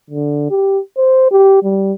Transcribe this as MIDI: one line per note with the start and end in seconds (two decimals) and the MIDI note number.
0.10 0.46 50
0.50 0.79 67
0.97 1.30 72
1.31 1.61 67
1.63 1.93 55